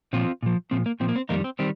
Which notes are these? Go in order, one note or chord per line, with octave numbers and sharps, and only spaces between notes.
A#2 F3 C4 F4
A#2 F3
A#2 F3 C4
A#3
A#2 F3 C4
A#3
C4
F2 D#3 G3 A#3 D#4
C4
D#3 G3 C4